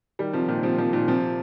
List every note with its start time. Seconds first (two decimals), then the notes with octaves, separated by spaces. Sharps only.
0.19 D#3 G3
0.33 C3 F3
0.48 A#2 D#3
0.63 C3 F3
0.78 C3 F3
0.93 A#2 D#3
1.08 C3 F3